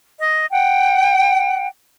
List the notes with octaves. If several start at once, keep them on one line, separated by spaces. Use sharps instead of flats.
D#5
F#5 G5